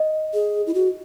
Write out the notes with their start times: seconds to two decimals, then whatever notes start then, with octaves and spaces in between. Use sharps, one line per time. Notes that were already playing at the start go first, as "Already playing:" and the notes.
Already playing: D#5
0.34 G#4
0.67 E4
0.74 F#4